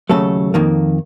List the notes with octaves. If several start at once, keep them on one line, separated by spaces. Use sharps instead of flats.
D#2 C#3 F#3 A3 A4
F2 D#3 A#3